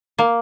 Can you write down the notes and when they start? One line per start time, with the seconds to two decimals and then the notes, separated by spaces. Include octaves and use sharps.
0.18 A#3